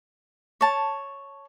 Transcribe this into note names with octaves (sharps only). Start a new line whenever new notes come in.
C#5 A5